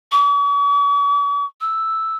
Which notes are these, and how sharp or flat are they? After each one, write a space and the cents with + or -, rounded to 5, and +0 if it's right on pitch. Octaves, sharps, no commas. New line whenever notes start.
C#6 +45
E6 +0